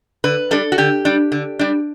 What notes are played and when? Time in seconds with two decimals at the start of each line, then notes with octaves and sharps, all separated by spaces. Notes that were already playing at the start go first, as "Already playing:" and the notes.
0.24 D3 B4
0.51 G3 D4 A4
0.72 F#4
0.78 D3 G4
1.05 G3 D4
1.32 D3
1.59 G3 D4